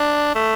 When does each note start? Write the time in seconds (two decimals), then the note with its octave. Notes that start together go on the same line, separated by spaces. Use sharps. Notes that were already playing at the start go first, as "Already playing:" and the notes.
Already playing: D4
0.35 A3